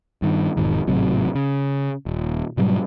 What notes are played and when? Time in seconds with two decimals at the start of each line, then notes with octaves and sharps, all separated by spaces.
0.22 G2 D#3
0.57 E1 G#2 D#3
0.87 G#1 A2 C3 F#3
1.35 C#3
2.06 D#1
2.57 G#2 B2 F#3 G3